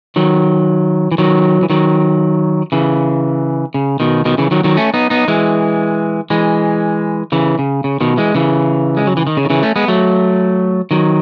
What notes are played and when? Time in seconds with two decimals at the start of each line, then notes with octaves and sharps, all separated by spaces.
0.16 D#3 F#3
1.12 E3
1.18 D#3 F#3
1.62 E3
1.70 D#3 F#3
2.72 C#3 E3
3.74 C#3
4.00 B2 D#3
4.25 B2 D#3
4.38 C#3 E3
4.51 D#3 F#3
4.64 D#3 F#3
4.77 A3 C#4
4.94 B3 D#4
5.10 B3 D#4
5.28 E3 G#3
6.30 E3 G#3
7.32 C#3 E3
7.59 C#3
7.84 C#3
8.01 B2 D#3
8.17 E3 G#3
8.35 C#3 E3
8.97 G#3
9.07 F#3
9.17 E3
9.27 D#3
9.37 C#3
9.45 D#3
9.50 C#3 E3
9.63 A3 C#4
9.76 G#3 B3
9.88 F#3 A3
10.91 D#3 F#3